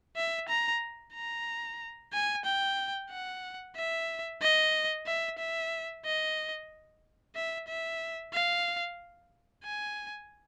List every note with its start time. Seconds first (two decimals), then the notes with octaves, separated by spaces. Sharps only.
0.16 E5
0.48 A#5
1.14 A#5
2.13 G#5
2.45 G5
3.10 F#5
3.76 E5
4.42 D#5
5.06 E5
5.39 E5
6.05 D#5
7.35 E5
7.68 E5
8.33 F5
9.64 G#5